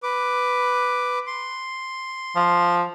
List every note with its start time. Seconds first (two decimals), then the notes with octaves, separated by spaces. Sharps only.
0.03 B4 D6
1.27 C6
2.36 F3